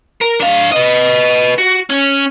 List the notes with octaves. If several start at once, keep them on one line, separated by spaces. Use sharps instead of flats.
A#4
D4 F5
B4 D#5
F#4
C#4